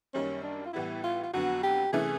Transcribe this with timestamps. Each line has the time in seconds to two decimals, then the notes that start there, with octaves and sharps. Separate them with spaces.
0.14 F#2 D#3 G3 A#3 C#4
0.44 D4
0.66 F4
0.73 A2 E3 G3 B3 E4
1.04 F4
1.24 F4
1.34 F2 D3 F#3 B3 F#4
1.63 G4
1.93 C3 E3 A3 C#4 E4 G#4